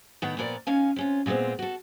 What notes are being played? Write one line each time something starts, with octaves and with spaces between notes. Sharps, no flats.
A2 D#3 B3 F#5 G5
A#2 F3 B3 A#4 D5
D#3 C#4 F5 G#5
C3 C#4 F4
A#2 G#3 A3 B3 C4
F#4 A4